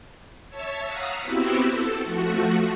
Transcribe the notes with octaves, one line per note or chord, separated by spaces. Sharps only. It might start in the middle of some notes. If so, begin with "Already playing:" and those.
C#5 E5 A5
F5 F#5 A#5 D#6 E6 B6
B3 C4 E4 F#4 G4 E5
A4
F3 A3 F#4